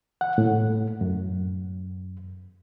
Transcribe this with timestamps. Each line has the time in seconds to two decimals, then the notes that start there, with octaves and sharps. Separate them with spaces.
0.21 F#5
0.38 A2
1.01 F#2